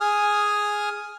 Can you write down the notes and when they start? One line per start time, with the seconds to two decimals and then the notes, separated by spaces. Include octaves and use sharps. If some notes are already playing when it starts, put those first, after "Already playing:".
0.01 G#4 G#5 D#6 F6